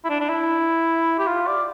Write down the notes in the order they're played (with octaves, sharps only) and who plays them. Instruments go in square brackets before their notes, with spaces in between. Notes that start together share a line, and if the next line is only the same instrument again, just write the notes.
[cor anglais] E4
D4
D4
E4
G4
F4
D5